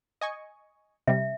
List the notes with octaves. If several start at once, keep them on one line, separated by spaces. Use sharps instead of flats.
D#5 G#5 C#6
C3 G3 E5